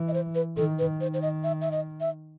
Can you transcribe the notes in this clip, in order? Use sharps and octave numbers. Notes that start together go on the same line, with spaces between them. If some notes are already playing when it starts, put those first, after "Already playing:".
Already playing: E3
D#5
C5
B4
D#3 A4
B4
D#3 C5
C5
D#5
E5
E5
D#5
E5